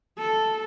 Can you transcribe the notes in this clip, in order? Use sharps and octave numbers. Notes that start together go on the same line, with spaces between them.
A4